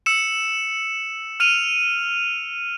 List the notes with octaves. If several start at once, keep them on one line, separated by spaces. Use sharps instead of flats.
E6 C#7 E7
F6 D#7 F7